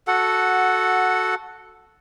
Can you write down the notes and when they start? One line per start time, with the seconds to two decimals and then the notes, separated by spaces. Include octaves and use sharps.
0.07 F#4 A4 F#5